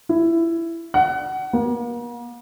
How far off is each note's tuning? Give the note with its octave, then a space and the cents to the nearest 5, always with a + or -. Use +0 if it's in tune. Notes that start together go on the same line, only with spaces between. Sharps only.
E4 +15
F#5 +25
A#3 +40